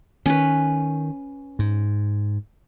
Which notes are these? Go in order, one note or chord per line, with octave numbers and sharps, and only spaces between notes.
D#3 C#4 B4
G#2